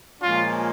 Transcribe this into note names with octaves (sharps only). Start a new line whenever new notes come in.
A#2 F3 G#3 C#4 F4